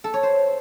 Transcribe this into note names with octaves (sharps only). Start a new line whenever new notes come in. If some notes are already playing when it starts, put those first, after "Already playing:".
A4
C#5
C5